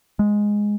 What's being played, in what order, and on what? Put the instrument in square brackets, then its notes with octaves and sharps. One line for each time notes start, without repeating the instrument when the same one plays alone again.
[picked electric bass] G#3